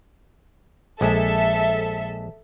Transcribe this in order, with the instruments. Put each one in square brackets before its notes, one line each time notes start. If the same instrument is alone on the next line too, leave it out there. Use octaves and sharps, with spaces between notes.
[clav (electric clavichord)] A#1 G#3 [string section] A4 E5